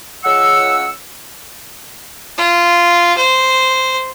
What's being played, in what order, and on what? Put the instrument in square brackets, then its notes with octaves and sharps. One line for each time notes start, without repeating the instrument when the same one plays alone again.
[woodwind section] C#2 C#3 F#5 C#6 E6
[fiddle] F4
C5